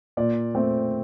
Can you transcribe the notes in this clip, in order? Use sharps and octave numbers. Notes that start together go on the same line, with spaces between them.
A#2 D5
A3 C4